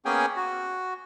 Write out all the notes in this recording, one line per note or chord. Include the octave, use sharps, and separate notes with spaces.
A#3 B3 C#4 G#4 G5 G#5
F#4